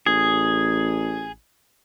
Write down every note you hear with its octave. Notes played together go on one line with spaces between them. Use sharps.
A1 G#4